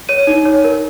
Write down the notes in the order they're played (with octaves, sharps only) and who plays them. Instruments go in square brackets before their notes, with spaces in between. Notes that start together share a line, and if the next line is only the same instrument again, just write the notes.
[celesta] C#5 D#7
D#4
C#5
A#4